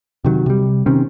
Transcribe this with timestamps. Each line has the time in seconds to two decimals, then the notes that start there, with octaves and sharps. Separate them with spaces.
0.25 C3 D#3 F#3
0.46 C3 G3
0.86 C3 D#3 C4 C#4